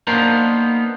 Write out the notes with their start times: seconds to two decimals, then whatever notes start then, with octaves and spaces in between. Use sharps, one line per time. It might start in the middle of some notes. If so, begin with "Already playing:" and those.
0.07 A#3 B3 D4 D#4 A#4 C5